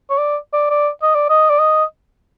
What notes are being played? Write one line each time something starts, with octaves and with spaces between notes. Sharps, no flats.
C#5
D5
D5
D5
D#5
D5
D#5
D5
D#5